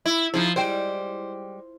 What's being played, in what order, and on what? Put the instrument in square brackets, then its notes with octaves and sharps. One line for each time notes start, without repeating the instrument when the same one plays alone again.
[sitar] E4
[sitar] F3 [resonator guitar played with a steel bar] D#4 E4 G#4
[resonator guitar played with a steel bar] G3 G#3 G5 [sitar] C5